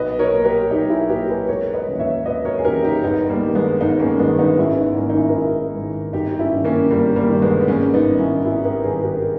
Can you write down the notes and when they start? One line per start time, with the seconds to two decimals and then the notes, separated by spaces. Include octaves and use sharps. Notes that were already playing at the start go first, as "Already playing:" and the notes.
Already playing: B1 B4 D#5
0.19 A#4 C#5
0.32 A#2
0.45 G4 A#4
0.70 B1 D#4 G4
0.90 E4 G#4
1.09 A#2 G4 A#4
1.29 G#4 B4
1.48 E1 A#4 C#5
1.74 B4 D#5
1.87 D#2 C#3 E3
2.00 C#5 E5
2.26 E1 B4 D#5
2.45 A#4 C#5
2.58 G#4
2.65 D#2 C#3 E3 G4 A#4
2.83 D#4 G4
3.03 G1 B3 D#4
3.29 G3 A#3
3.43 G2 D#3
3.55 G#3 B3
3.81 G1 B3 D#4
4.00 A#3 C#4
4.19 G2 D#3 G#3 B3
4.38 B3 D#4
4.58 G#1 C#4 E4
4.77 B3 D#4
4.96 G#2 D#3 A#3 C#4
5.09 D#4
5.17 C#4 E4
5.29 A#4
5.35 G#1 E4 G#4
5.74 G#2 D#3
6.13 G1 D#4 G4
6.39 C#4 E4
6.52 G2 D#3
6.64 A#3 C#4
6.90 G1 G3 A#3
7.16 G3 A#3
7.29 G2 D#3
7.42 G#3 B3
7.60 B3
7.68 G#1 A#3 C#4
7.94 B3 D#4
8.06 G2 D#3
8.19 C#4 E4
8.45 G#1 E4 G#4
8.65 G4 A#4
8.84 G2 D#3 G#4 B4
9.03 G4 A#4